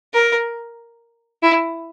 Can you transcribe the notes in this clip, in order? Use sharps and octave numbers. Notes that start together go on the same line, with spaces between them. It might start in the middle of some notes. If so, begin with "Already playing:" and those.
A#4
E4